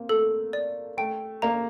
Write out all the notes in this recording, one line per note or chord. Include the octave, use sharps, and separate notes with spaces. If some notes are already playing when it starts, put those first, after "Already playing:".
Already playing: A#3 C4
A3 A4
D5
A3 G5
A#3 A#5